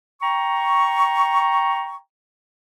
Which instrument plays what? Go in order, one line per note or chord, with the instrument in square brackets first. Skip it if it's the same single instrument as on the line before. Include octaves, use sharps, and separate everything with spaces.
[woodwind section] G5 A#5 C#6